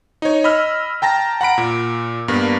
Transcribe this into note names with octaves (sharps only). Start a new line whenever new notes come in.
D#4 C#5
D#5 B5 E6 F6
G5 A5 A#5 A#6
F#5 A#5 B5 D7
A#2
G2 A#3 B3